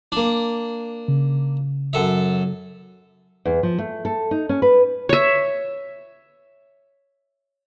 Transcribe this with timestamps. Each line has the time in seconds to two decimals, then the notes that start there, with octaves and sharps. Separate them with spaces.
0.12 A#3 D4
1.08 C#3
1.93 F#2 A4 E5
3.45 E2
3.63 F3
3.78 A3
4.05 A4
4.31 D#4
4.49 C#4
4.62 B4
5.09 C#5 E5